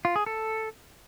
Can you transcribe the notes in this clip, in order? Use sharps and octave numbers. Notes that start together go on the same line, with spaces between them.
F4
G#4
A4